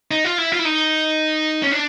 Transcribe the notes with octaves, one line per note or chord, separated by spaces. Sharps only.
D#4
F4
E4
F4
E4
D#4
C#4
D4